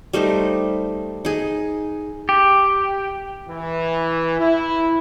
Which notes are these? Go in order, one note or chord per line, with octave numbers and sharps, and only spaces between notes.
G3 A3 D#4 C5
D#4 G#4
G4
E3
E4